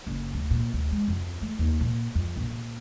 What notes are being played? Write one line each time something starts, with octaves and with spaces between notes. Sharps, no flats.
F#1
D2
A#2
D2
G#3
F2
A3
D#2
A#2
F2
A#1
A#2